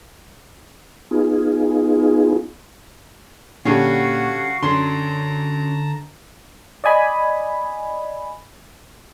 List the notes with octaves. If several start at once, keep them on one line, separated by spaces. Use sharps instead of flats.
B3 D#4 F4 G#4
A#2 D3 G3 C#4 F#4 F5 F#5
F#2 D3 D4 A5 A#5 C6
D5 D#5 G#5 B5